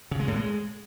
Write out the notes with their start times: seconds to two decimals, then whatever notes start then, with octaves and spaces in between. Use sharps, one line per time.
0.11 C#3
0.20 G#3
0.28 A2
0.36 G#3